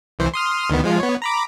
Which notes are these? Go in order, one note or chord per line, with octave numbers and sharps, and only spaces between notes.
C2 E3 C5
C6 D#6 F6
D2 D#3 B3
F3 G#3 F4
B3 C#5
A#5 B5 D6